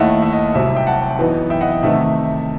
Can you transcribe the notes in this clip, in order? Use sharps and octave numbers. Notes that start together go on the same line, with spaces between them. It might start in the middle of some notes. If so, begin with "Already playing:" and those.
Already playing: D#2 D#3 A3 E4 D#5 F#5
E5
D#5
C2 C3 F#3 E5
E5
E5 G5
F#5 A5
F#2 E3 B3 D#4
E5 G5
D#5 F#5
D#5
C3 D#3 A3 D#4 E5